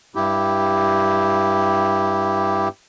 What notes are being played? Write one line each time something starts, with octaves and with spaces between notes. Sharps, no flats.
G2 E4 G4